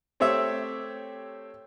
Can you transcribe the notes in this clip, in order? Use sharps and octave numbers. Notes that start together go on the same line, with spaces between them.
A3 C4 G4 C#5 E5